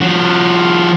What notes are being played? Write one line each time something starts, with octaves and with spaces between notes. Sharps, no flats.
F3 F#4